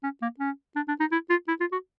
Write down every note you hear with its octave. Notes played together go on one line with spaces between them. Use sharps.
C#4
A#3
C#4
D4
D4
D#4
E4
F4
E4
F4
F#4